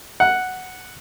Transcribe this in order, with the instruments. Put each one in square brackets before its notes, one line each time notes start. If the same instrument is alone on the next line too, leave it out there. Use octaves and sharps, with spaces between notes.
[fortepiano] F#5